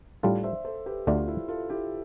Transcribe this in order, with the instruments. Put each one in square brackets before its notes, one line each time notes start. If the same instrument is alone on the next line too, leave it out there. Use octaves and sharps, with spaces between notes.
[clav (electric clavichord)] A2 G3 D4 F4 A4 [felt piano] D5 F5
[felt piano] C5 E5
A4 C5
G4 B4
[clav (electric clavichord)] D2 D3 A3 D4 [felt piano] F4 A4
[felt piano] E4 G4
F4 A4
E4 G4